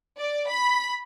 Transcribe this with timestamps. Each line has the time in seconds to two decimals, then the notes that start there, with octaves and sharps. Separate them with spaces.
0.19 D5
0.48 B5